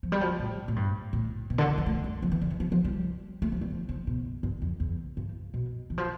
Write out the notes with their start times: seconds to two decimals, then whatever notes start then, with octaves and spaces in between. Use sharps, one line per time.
0.03 F3
0.12 G3
0.21 F3
0.39 A2
0.68 A2
0.76 G2
1.13 A2
1.50 B2
1.58 D3
1.68 D3
1.78 E3
1.86 A3
2.04 G3
2.22 F3
2.32 E3
2.41 D3
2.51 E3
2.60 F3
2.72 F3
2.85 G3
3.42 A3
3.52 F3
3.61 G3
3.71 F3
3.89 C3
4.07 B2
4.43 G2
4.62 F2
4.80 E2
5.17 G2
5.54 B2
5.90 E3
5.98 F3